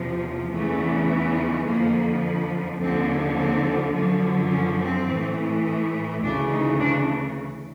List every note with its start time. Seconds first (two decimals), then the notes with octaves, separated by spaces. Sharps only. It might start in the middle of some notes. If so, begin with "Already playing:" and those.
Already playing: E2 C3 F3
0.53 E2 C#3 E3 A3
1.67 F2 D3 F3 A#3
2.81 D#2 D3 F3 C4
3.38 C4
3.95 F#2 D3 F3
4.52 C#4
4.81 C4
5.09 A2 E3
6.23 D2 C#3 E3 D4
6.52 D#4
6.80 D4